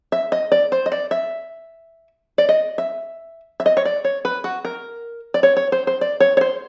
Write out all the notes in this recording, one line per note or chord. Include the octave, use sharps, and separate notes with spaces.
E5
D#5
D5
C5
D#5
D5
E5
D5
D#5
E5
E5
D#5
C#5
D5
C#5
B4
F#4
A#4
D5
C#5
C#5
C5
C5
D5
C#5
C#5
C5